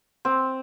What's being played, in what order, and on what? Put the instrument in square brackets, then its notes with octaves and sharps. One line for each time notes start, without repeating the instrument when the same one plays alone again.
[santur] C4